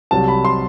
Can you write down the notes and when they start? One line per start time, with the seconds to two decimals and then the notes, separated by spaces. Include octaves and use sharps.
0.11 C2 C3 F#3 A5
0.28 B5
0.45 C6